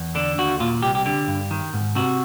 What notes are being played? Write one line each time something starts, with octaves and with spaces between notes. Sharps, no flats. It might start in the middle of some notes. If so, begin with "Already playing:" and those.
Already playing: E2
D3 D4
D#2 F#4
A#2 F4
C2 G4
G4
D3 G4
G2
D#3
G#2
C3 F#4